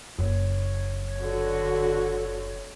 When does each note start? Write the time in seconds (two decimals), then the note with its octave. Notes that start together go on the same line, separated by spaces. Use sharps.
0.18 F#1 F#3 C#5
1.21 D3 F#4